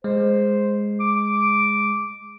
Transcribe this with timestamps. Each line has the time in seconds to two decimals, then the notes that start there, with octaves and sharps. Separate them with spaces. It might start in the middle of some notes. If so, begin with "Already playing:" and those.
0.04 G#3 C5
1.00 D6